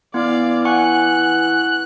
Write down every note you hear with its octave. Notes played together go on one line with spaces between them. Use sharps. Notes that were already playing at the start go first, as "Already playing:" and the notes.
E3 B3 D5 F5
F#5 G#5 C#6 F#6